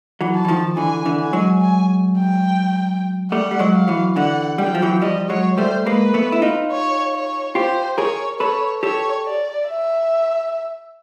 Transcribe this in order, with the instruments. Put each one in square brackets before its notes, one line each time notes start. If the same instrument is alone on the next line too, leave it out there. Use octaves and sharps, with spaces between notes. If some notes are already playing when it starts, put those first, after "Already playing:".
[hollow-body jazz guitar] E3 F#3
[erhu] A5
[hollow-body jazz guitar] E3
D#3 F3
[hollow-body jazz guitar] D3 E3 [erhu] G#5
[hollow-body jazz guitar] D3 E3
[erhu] G#5
[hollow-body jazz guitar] F#3 G#3
[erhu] G#5
G5
[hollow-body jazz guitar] G3 A3 [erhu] F#5
[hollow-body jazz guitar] G3
F#3 G#3
[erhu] F5
[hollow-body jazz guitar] E3 F#3
[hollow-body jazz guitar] D3 E3 [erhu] F#5
[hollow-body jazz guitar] G3 [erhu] G5
[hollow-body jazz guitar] F#3
F3
E3 F#3
[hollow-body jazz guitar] F3 G3 [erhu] D#5
[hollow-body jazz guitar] F#3 G#3 [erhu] C#5
[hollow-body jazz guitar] G3 A3 [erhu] C5
[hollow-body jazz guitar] G#3 A#3 [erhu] B4
[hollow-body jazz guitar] A3 B3
E4
D#4 F4
[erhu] C#5
C#5
[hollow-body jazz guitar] F4 G4 [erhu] C5
[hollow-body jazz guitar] G#4 A#4 [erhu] C#5
[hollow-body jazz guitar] A4 B4 [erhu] C#5
[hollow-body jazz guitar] G4 A4 [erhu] C#5
[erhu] D5
E5